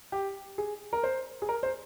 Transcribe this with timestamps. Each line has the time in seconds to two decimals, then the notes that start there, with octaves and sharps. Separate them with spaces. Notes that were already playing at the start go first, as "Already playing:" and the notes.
0.12 G4
0.58 G#4
0.93 A#4
1.03 C5
1.42 G#4
1.49 A#4
1.63 C5